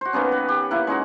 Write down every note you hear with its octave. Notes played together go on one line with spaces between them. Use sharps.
F#4 C5
D#3 A#3 B3 C#4
B4
G4
A#3 E4 F#5
G#3 C#4 D#4 F#4